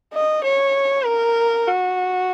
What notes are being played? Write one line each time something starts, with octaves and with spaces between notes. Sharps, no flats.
D#5
C#5
A#4
F#4